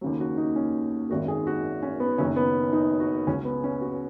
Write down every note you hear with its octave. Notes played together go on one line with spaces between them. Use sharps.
D#2 C#3 F#3
F#4
D#4
C#4
G#1 F#2 D#3 F#4
G#4
F#4
C#4
B3
F#1 F#2 D#3 F#3 C#4
B3
D#4
F#4
C#2 C#3 F#3 C#4
B3
C#4
F#4